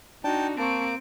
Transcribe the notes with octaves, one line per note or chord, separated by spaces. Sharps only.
D4 D#4 F#4 G5 A5
A#3 C4 A5 C#6 D7